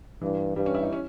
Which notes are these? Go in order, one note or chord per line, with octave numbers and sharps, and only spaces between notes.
G2 E3
G2 G3
C#4
E4
D#4
C#4